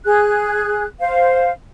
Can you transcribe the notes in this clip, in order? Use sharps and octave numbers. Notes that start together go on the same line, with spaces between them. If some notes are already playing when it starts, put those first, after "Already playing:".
G#4 F#6
C5 F5